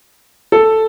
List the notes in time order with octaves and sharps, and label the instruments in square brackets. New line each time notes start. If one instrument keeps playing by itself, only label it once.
[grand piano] A4